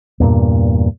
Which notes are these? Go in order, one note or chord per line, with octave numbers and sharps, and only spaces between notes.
E2 G2 A#2